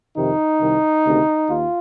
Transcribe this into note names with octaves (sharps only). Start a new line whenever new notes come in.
F2 C3 D#3 D#4
C2 C3 D#3
D2 C3 D#3
D#2 F4